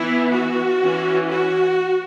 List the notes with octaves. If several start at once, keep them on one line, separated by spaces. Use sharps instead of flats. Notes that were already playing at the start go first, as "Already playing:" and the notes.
Already playing: E3 B3 E4
F#4
E3 C#4
F#4